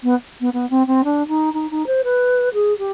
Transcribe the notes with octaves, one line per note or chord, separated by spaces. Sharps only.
B3
B3
B3
C4
C4
D4
D#4
D#4
D#4
C5
B4
G#4
G4